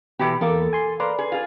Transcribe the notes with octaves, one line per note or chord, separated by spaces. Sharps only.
E2 B2 E3 G4 B5 D6
E2 A#3 A4 D6
G#5 C6
A#3 B4 D5 C6
G#4
F4 G#4